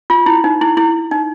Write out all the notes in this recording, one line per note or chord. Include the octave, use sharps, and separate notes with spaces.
F4
E4
D#4
E4
E4
D#4